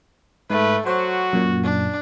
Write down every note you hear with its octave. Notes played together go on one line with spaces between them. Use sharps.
G#2 A3 B4
F#3 F#4 C5
F#2 A#2
D4